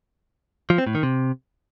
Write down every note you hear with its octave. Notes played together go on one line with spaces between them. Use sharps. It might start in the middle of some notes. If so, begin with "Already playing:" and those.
F3
C4
A2
D#3
C3